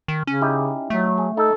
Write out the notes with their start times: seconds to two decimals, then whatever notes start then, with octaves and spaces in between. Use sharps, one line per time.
0.08 D#3
0.27 C#3 C#4
0.42 D#4 E4 G4
0.90 F#3 A3
1.18 G#4
1.37 D#4 A4 E5